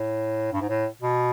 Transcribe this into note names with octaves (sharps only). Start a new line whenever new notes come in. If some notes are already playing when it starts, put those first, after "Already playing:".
Already playing: A2
G2
G#2
A2
B2